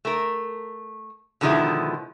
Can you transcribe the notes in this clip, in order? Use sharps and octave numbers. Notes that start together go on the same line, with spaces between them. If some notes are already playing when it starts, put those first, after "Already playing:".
A3 A#4
B2 D3 D#3 F3 G#3 E4